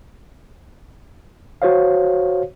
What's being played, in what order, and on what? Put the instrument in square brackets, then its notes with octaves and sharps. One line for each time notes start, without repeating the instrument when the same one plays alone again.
[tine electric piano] F#4 C5 C#5 F5